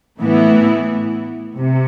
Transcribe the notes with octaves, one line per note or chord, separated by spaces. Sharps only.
A2 E3 B3 E4
C3